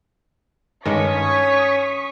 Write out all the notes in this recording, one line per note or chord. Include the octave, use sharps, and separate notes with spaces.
G2 D#3 G#3 C#4 C#5 C#6 D#6 B6